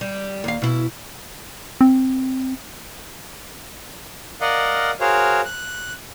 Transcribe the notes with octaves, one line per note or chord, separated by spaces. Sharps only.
G3
D#2 F5
B2 E4
C4
A#4 D5 D#5 F5 F#5
F#4 G#4 A#4 C5 C#5 F5
F#6